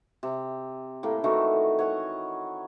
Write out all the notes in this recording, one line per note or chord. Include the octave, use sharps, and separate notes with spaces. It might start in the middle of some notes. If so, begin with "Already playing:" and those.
C3
A2 A#3 G5
D#3 E3 A3 F#4
C#5 F#5 G#5